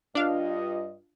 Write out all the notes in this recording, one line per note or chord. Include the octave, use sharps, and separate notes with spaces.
G2 D4 F4 D#5 F5